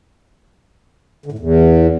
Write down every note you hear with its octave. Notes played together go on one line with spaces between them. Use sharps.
D3
A2
E2